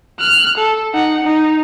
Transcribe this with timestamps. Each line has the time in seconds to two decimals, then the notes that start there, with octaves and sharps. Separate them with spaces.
0.20 F6 F#6
0.58 A4
0.94 D#4 F#5
1.23 D#4